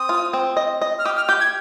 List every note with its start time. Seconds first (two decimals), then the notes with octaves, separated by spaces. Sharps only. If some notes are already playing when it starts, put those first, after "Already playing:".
Already playing: C4 D#6
0.09 F4
0.33 C4
0.57 D#5
0.82 D#5
0.99 F6
1.05 G4 D#6
1.17 F6
1.28 G4 G6
1.41 G#6